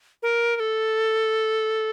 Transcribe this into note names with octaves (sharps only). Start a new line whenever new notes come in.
A#4
A#4
A4